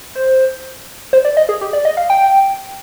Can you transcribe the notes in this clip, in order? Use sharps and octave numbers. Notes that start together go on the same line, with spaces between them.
C5
C5
D5
D#5
G#4
G4
D5
D#5
F5
G5